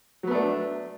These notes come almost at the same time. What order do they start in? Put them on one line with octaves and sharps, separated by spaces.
F#3 B3 A3 D4